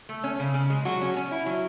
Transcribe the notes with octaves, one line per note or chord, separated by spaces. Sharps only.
A3
C#4
C#3
C#3
G#3
F#3 F#4
C#4
C#4
E4
F#3